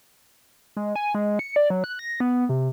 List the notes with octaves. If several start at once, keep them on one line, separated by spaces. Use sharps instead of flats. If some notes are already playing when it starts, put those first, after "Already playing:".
G#3
G#5
G#3
C#7
D5
F#3
F#6
A#6
B3
C3